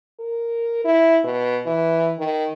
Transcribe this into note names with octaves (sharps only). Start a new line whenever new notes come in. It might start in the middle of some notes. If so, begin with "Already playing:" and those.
A#4
E4
B2
E3
D#3